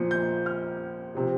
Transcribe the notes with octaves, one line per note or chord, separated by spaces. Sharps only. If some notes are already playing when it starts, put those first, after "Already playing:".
Already playing: A#2 F3
G6
F6
C3 F3